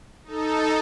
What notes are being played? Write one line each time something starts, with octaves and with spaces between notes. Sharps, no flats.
D#4 A4